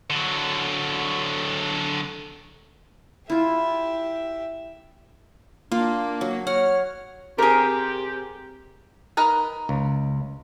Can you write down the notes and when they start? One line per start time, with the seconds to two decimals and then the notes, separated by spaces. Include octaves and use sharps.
0.10 D3 F#3
3.30 E4 F4 G4 E5
5.72 A#3 D4 F4
6.21 F#3
6.47 C#5 F#5 F6
7.38 C3 G4 G#4 A#4
9.17 D#4 A#4 B4
9.69 C#2